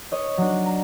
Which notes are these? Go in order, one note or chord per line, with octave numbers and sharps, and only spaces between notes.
C#5 D#5
F#3 D4
A#5